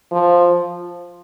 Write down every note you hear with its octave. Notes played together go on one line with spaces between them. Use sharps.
F3